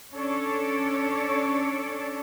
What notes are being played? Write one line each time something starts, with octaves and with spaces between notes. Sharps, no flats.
C#4 D4 A4 C#5 D5